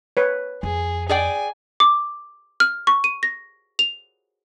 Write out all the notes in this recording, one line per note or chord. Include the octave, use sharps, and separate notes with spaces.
B4 C#5
F2 G#4
G#4 D5 G5 G#5
D6
F6
C#6
D#7
A#6
F7